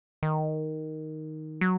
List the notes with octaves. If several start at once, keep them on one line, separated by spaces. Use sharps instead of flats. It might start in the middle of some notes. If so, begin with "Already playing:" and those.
D#3
F#3